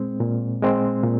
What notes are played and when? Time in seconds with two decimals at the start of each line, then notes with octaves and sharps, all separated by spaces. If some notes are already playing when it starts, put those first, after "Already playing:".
Already playing: A#2 G#3 C4
0.20 A#2
0.62 G#3 C4
1.03 A#2